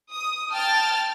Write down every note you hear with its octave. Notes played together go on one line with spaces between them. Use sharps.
D#6
G5 A5 F6 A6